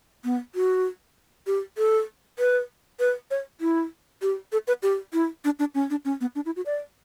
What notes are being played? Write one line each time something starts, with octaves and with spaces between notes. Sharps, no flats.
B3
F#4
G4
A4
B4
B4
C#5
E4
G4
A4
B4
G4
E4
D4
D4
C#4
D4
C#4
B3
D4
E4
F#4
D5